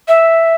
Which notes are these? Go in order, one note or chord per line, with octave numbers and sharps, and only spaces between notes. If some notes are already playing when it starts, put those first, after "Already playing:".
E5